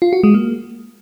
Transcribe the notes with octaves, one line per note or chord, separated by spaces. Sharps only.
F4
F#4
G#3
A#3